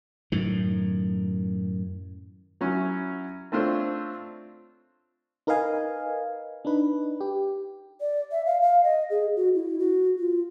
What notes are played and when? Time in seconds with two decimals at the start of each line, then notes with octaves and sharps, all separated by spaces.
0.32 F#2 A2 D#3
2.61 F#3 C#4 E4
3.52 A3 C4 D4 F4 C5 C#5
5.47 D#4 A#4 B4 D#5 F5 G#5
6.65 D4 D#4 B4
7.21 G4
8.01 D5
8.32 E5
8.46 F5
8.61 F5
8.84 D#5
9.10 G#4
9.36 F#4
9.55 E4
9.79 F#4
10.19 F4